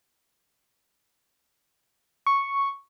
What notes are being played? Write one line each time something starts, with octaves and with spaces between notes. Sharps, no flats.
C#6